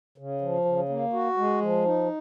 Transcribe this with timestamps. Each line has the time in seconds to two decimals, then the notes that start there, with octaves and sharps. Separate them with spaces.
0.18 C#3
0.41 F3
0.65 C#3
0.89 A#3
1.13 F#4
1.37 G#3
1.61 F3
1.85 D#4